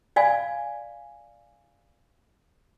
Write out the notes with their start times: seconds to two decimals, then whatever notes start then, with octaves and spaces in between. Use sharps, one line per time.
0.16 D5 F5 G#5